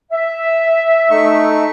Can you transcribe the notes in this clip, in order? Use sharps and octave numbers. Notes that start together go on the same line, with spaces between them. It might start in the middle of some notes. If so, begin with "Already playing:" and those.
E5
A3 D#4 C#6